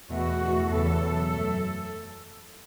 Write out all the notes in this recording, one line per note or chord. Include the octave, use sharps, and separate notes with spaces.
E2 B2 A3 F#4
E2 E3 A3
E2 C#3 E3 A4
E2 B2 F#3
F#2 F#3 A3